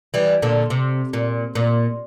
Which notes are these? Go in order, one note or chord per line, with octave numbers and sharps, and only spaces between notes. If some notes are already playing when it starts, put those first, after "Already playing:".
E3 G3
A#2 D3
C3
A#2
A#2